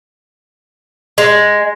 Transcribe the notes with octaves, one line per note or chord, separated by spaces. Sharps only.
G#3